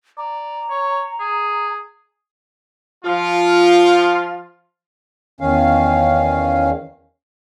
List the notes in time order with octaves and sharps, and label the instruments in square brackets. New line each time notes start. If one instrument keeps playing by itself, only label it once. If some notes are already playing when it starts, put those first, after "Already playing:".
[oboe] D5 [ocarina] A#5
[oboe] C#5
G#4
[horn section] F3 F4
[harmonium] E2 D#3 C#4 F5